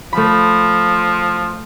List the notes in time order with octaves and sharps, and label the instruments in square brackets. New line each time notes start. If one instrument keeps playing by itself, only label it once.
[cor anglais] F3 [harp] A3 B5